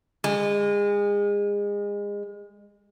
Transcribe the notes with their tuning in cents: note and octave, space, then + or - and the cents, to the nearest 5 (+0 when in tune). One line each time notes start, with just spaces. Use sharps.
G#3 -30